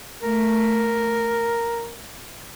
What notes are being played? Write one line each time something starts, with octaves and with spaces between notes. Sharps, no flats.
A3 A#4